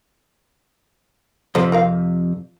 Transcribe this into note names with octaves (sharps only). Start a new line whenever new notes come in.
F2 C3 F4 A4 C5
F4 A#4 F5